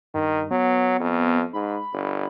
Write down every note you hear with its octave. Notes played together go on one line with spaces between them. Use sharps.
G2 D#3
F#3 B3
F2
G#2 B5
G1